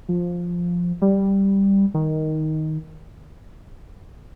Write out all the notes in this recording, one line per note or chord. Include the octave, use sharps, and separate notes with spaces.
F3
G3
D#3